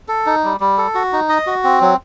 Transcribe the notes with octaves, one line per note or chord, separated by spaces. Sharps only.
A4
D#4
G3
G3
A4
F#4
D#4
D#5
F#4
C4
F#3